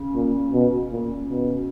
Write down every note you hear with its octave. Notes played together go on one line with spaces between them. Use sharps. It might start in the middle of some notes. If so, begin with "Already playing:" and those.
Already playing: C#3
A#2
B2
A#2
B2